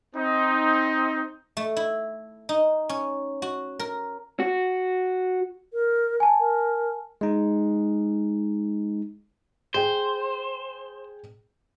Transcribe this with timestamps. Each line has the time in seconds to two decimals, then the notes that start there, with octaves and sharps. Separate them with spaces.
0.15 C4 D#4
1.57 A3
1.77 E4
2.49 D#4
2.89 C#4
3.42 F#4
3.79 A#4
4.40 F#4
5.73 A#4
6.20 G#5 A5
6.40 A#4
7.21 G#3 D#4
9.74 G#4 C5 G5